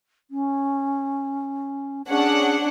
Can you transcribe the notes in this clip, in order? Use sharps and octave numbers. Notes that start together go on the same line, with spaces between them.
C#4
C#4 D4 G#4 F#5